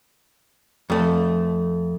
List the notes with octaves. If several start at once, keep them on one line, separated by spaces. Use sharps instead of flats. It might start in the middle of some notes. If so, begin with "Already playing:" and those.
F2 A3